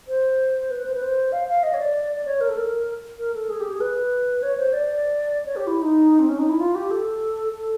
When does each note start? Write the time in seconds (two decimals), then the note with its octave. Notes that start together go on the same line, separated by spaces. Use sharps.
0.08 C5
0.70 B4
0.85 C5
0.94 B4
1.03 C5
1.32 F5
1.48 F5
1.63 D#5
1.74 C#5
1.79 D5
2.16 D5
2.25 C#5
2.41 A#4
2.49 A4
2.57 A#4
3.18 A#4
3.34 A4
3.50 G#4
3.60 G4
3.70 G#4
3.80 B4
4.42 C#5
4.58 C5
4.73 D5
5.46 C#5
5.56 G4
5.67 E4
5.82 D#4
6.19 C4
6.29 C#4
6.39 D#4
6.49 E4
6.60 F4
6.75 G4
6.91 A4
7.52 A4